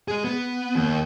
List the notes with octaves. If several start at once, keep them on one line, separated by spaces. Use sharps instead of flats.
G#4 D#5
B3
D#2